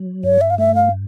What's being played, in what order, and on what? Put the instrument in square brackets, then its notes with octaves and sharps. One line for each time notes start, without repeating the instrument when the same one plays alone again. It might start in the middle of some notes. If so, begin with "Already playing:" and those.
Already playing: [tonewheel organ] F#3
[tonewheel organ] G2 [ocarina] C#5
[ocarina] E5
F5
[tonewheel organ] A3 [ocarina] E5
[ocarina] F5